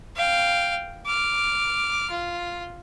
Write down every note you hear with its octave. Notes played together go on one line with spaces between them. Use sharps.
F5 G5
D6 F6
F4